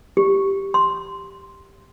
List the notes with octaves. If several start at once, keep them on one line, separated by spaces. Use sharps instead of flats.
G4
C6